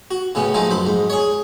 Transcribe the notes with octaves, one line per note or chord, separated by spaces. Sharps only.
F#4
A2 C#3 B3 C#4
F3 G#3 A3 D#4
F#2 C5 B5
G#2
G#4 C#5